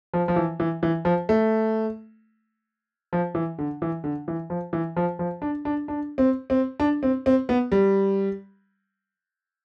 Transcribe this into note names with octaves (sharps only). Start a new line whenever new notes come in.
F3
F3
E3
E3
E3
F3
A3
F3
E3
D3
E3
D3
E3
F3
E3
F3
F3
D4
D4
D4
C4
C4
D4
C4
C4
B3
G3